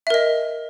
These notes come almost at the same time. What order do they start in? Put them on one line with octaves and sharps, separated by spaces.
E5 A#4 D#5